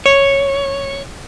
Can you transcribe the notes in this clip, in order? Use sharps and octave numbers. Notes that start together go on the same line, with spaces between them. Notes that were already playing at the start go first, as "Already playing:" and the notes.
C#5